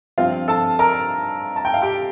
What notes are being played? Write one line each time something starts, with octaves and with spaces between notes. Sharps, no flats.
G2 F3 C4 F4 F5
A4 A5
A#4 A#5
A5
G5
F5
G4 G5